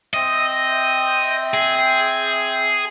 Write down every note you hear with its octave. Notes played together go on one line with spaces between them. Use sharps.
C4 D#5 E5 G5
G#4